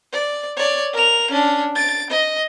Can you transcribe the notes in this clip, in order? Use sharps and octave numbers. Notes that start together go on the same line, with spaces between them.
D5
C#5 D5
A#4 F7
C#4 D4
A6 D7
D#5